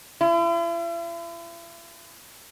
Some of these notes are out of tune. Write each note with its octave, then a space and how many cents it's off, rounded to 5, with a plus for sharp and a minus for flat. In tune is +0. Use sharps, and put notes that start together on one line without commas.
E4 +45